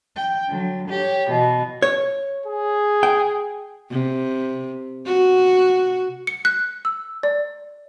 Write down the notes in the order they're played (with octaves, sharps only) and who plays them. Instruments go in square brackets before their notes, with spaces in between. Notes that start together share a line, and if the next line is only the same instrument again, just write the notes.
[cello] G5
D3 F#3
G4 C#5
B2 E3
[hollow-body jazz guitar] C#5
[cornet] G#4
[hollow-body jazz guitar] G5
[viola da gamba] C3
F#4
[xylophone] C#7
F#6
E6
D5